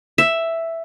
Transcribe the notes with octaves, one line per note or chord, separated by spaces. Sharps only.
E5